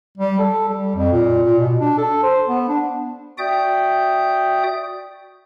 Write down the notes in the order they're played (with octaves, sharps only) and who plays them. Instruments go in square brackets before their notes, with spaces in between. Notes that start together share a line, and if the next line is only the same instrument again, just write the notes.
[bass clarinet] G3
A4
G3
F2
A#2
A#2
B2
D4
A4
C5
B3
D4
[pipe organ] F#4 D5 E5 G5 D#6 G6